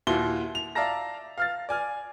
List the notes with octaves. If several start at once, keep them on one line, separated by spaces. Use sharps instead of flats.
D#2 A#2 E4 F#4 C6 G7
F7
D5 E5 F5 A5 A#5 A#6
F5 F6 A6
D5 G#5 F6